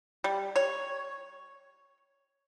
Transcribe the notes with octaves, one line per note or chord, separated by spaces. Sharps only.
G3
C#5